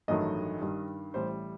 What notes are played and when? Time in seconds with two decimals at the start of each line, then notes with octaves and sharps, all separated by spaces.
0.08 A1 G2 D#3 F#3 A3 D#5
0.61 G2 D#3 G3
1.14 A1 A2 G3 C5